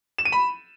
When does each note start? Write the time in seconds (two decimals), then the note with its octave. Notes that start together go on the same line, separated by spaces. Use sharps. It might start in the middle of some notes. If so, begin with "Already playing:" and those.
0.18 E7
0.25 D#7
0.32 B5